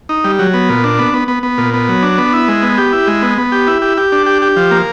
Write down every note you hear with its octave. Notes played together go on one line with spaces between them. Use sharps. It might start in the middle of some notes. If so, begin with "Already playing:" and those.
D#4
G3
F#3
B3
A#2
D4
B3
B3
B3
B3
A#2
B3
F#3
D4
B3
E4
G#3
B3
G4
E4
G#3
B3
B3
G4
E4
G4
G4
D4
G4
G4
F3
A#3